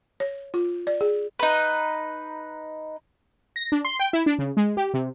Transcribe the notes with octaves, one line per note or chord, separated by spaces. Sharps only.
C#5
F4
D5
G#4
D#4 B4
A#6
D4
C6
G5
E4
D4
C#3
G#3
G4
C3